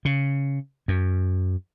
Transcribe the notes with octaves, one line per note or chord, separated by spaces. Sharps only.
C#3
F#2